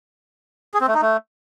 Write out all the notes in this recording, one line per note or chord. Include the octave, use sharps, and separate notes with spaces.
G#4
C4
A3
D#4
A3